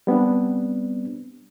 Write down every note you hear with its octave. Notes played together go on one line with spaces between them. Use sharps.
G3 B3 C4 D4